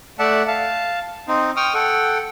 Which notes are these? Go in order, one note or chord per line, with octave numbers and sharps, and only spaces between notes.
A3 D5 E5 F#5 A5
F5 A5
C4 D#4
G5 C#6 D#6 F6
A4 F#5 G5